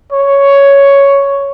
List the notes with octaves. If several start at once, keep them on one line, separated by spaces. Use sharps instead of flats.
C#5